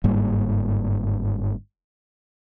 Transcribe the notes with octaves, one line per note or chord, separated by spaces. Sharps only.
G1 G#2 G3 A#3